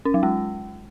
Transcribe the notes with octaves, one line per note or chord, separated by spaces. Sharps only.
C#4
F#3
G#3